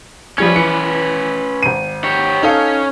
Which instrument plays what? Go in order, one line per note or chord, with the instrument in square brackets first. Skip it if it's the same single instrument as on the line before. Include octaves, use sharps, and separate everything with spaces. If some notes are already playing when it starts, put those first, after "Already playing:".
[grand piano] F3 G3 G#6 [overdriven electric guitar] C#4 B4
[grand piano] E3 C#7
G#1 D#7
[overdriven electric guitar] G4 C#5
[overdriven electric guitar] C#4 [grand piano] D#4 A4 F5